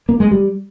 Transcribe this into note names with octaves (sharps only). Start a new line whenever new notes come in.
A#3
G#3
G3